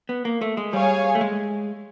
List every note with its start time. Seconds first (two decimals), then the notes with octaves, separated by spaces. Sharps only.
0.09 B3
0.25 A#3
0.42 A3
0.57 G#3
0.73 G3 G#4 C#5 F5 G#5
1.15 A3
1.21 G#3